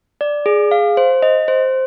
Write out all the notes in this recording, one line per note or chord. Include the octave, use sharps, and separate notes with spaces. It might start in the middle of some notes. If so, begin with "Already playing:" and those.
D5
G#4
F5
C5
D#5
C5